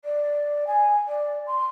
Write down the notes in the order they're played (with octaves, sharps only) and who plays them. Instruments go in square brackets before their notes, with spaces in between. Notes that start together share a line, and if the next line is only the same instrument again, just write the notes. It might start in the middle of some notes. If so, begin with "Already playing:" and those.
[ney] D5
G#5
D5
C6